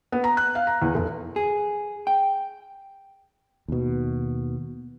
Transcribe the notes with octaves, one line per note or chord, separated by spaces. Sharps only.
B3
A#5
F#6
F5
A#5
E2
F1
G#4
G5
D#2 B2